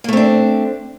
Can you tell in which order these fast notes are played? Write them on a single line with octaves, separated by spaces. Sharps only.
A#3 A3 C4 D4